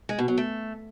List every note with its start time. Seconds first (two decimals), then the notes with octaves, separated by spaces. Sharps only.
0.09 G#3
0.19 B2
0.28 F#3
0.38 A3